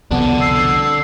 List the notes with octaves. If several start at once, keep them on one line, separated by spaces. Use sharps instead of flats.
C2 F2 B2 D3 B3 D4
E6 C7